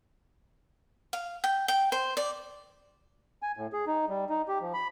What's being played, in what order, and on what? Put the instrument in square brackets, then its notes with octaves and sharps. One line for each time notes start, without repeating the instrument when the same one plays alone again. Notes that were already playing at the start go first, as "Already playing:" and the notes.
[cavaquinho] F5
G5
G5
C5
D5
[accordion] G#5
A2
G#4
D#4
G3
D#4
G4
F3
B5